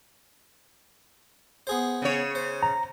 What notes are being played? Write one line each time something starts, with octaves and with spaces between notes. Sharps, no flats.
B3 G#4 C5
C#3 C#5
C5
A#5